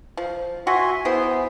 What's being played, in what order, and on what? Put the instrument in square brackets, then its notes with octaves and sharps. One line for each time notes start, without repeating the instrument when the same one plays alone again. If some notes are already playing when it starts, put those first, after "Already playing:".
[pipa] F3
[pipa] F#4 [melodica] E5 G#5 C6
[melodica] B3 [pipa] E4 G#4 C5